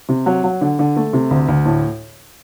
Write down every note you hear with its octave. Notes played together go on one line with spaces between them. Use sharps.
C3
F#3
F#3
D3
D3
A3
C3
D2
D2
A2